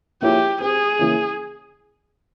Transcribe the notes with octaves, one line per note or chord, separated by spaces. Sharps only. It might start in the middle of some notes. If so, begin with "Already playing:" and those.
F3 A#3 E4 G4 G#4 C#5
C4 G4 G#4 C5
C#3 E3 A#3 C#4 E4